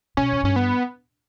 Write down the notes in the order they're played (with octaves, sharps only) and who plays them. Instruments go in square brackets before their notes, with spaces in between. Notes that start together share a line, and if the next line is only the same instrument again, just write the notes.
[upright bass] B2 [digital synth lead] C#4
[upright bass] E2
[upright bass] G2 [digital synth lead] C#4
[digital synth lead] B3